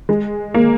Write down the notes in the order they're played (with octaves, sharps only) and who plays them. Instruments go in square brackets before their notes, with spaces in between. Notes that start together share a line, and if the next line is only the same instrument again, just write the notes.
[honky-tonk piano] G#3
A#3